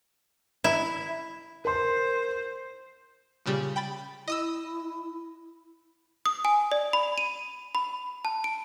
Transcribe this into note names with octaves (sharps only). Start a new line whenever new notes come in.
E4
A#4 C5 C6
A#2 C#3 G3
G5 B5 A6
E4 D#5 D#6 E6
D#6
G#5
D5
B5
D#7
B5
A5
D7